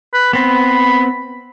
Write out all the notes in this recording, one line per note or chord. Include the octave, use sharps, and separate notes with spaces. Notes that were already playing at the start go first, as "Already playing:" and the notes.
B4
B3 C4 B5